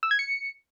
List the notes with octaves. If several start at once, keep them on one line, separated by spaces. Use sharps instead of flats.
E6
G#6
C#7